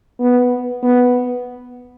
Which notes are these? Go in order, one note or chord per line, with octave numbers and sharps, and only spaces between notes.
B3
B3